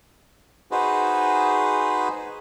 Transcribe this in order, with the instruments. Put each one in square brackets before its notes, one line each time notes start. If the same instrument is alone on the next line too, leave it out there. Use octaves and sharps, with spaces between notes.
[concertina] D#4 F#4 G#4 B4 C5